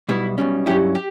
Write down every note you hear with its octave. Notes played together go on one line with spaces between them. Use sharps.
B1 B2 G3 B3 E4
B1 B2 G3 C#4
G2 F#3 C#4 E4 G4
G4